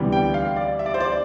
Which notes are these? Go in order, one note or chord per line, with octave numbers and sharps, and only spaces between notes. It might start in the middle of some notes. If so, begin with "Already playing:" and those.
Already playing: D2 C3 E3 G3 B3
G5
F5
D5
E5
D5
C5
D5